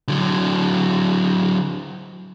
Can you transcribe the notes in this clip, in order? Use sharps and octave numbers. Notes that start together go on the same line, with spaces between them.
D3 F#3